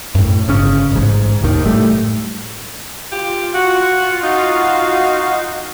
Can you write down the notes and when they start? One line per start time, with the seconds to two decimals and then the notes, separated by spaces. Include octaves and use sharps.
0.15 F#2 A2
0.48 G1 C#3 C#4
0.92 A1 G#2
1.41 F#1 D#2 D#3
1.65 A2 G3 A3
3.12 F4 G4
3.54 F#4
4.24 D#4 F#4 F5